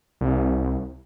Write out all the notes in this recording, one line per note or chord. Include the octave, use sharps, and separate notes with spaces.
C2